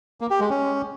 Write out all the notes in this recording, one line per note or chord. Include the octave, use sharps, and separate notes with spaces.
A#3
G4
G#3
C#4